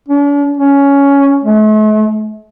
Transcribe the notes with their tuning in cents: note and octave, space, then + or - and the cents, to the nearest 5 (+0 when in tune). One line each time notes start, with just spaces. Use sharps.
D4 -45
C#4 +10
A3 -45